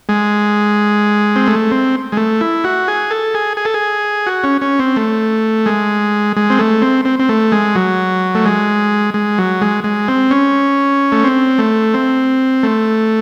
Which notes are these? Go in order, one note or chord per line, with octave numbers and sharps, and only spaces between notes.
G#3
C4
A3
C4
G#3
A3
E4
F#4
G#4
A4
G#4
G#4
A4
G#4
F#4
C#4
C#4
C4
A3
G#3
G#3
C4
A3
C4
C4
C4
A3
G#3
F#3
A3
G#3
G#3
F#3
G#3
G#3
C4
C#4
A3
C4
A3
C4
A3